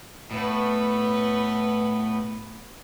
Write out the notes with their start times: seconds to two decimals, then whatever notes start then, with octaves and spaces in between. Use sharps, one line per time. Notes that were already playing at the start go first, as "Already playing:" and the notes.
0.31 A2 B3 B4